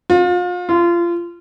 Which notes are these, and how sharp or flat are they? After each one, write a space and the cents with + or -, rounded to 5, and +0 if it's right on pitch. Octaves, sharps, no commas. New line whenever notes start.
F4 +35
F4 -25